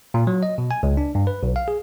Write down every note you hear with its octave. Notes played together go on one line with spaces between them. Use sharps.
A#2
F#3
D#5
B2
G#5
C#2
D4
G2
B4
B1
F5
G#4